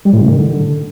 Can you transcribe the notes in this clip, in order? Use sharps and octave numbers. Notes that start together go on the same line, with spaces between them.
G3
A2
C#3
D#3
D3